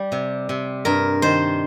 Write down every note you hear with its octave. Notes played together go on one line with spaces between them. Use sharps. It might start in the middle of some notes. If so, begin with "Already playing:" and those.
Already playing: G3
C3
C3
G2 A#4
D#3 C5